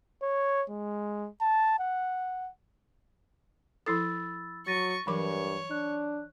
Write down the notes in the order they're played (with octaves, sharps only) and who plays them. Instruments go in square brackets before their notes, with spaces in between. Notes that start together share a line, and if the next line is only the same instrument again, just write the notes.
[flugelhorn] C#5
G#3
A5
F#5
[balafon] F3 E4 A4 [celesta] B5 E6 A6
[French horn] F#3 [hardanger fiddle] C#6 [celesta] A6 A#6 D#7
[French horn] G2 [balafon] E3 F#3 D6 [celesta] A#4 [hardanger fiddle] C#5
[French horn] D4 [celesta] F#6